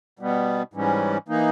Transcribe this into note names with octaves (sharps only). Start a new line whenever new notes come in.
B2 G3 B3
G#2 E3 G3 C#4
E3 A#3 D#4